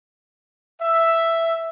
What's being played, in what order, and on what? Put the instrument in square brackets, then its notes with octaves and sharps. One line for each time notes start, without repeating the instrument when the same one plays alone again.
[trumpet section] E5